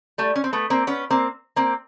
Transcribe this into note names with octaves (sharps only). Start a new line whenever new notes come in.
G3 A3
C#4
C4
A3 B3
A#3 C4
B3 C#4
A#3 C4
A#3 C4